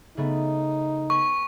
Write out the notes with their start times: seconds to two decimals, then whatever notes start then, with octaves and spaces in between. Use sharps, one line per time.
0.17 C#3 A3 B3 D#4
1.10 B3 B4 G#5 C#6